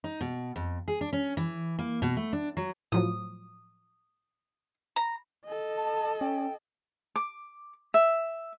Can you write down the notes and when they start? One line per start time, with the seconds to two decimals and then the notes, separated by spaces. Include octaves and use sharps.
0.04 D#4
0.21 B2
0.56 F2
0.88 G#4
1.01 D4
1.13 C#4
1.37 E3
1.79 A#3
2.02 B2
2.17 A3
2.33 D4
2.57 F#3
2.92 A2 F3 F#3 D#6
4.96 A#5
5.45 A4 D#5
5.77 A5
6.21 C#4 G5
7.16 D6
7.94 E5